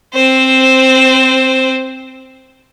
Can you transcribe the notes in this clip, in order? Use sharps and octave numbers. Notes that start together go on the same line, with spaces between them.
C4 C5